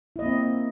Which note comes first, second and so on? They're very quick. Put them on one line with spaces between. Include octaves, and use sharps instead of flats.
E4 D#5 A#3 C4